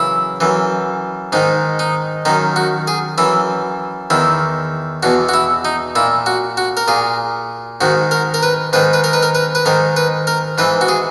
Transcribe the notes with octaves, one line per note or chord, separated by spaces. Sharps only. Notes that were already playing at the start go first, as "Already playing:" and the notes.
Already playing: F#2 C#3 E3 E4
F#2 E3
G#2 D#3 D#4
D#4
F#2 D#3 D#4
F#4
G#4
F#2 E3 E4
E2 D#3 E4
E2 B2 F#4
F#4
E4
D#4
A#2 E4
F#4
F#4
A#4
A#2 G#4
G#2 D#3 F#4
A#4
A#4
B4
G#2 D#3 B4
B4
A#4
B4
A#4
B4
B4
G#2 D#3 A#4
B4
A#4
G#2 E3 B4
F#4
G#4